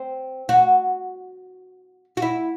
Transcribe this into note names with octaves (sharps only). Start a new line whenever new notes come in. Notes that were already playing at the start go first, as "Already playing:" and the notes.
Already playing: C4
F#4
F#4
E4